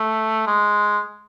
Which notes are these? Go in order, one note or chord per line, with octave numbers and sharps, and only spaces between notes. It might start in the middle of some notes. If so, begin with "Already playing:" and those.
Already playing: A3
G#3